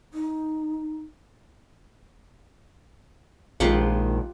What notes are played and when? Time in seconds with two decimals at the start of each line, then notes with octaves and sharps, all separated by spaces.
0.14 D#4
3.60 A#1 D#3 G#3 F4 G4 F#5